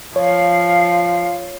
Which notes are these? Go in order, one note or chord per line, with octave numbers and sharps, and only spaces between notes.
F3 C#5 F5